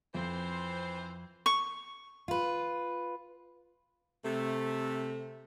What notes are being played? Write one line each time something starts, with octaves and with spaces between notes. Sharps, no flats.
F2 E3 C4 C5
C#6
F4 B4
C3 A3